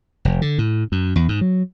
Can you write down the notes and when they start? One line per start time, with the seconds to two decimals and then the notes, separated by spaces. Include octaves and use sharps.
0.25 F1
0.42 D3
0.58 A2
0.92 F#2
1.16 E2
1.29 G#2
1.41 F#3